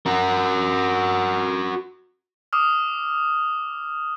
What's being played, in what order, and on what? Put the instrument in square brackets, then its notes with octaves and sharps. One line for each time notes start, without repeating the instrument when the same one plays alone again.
[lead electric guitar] F#4 A#4
[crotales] D6 D#6 F6